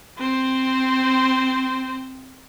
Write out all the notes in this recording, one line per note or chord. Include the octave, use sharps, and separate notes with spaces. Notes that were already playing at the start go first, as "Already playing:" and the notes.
C4 C5